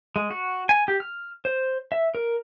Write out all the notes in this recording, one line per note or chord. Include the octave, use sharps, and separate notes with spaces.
G#3
F#4
G#5
G4
F6
C5
E5
A#4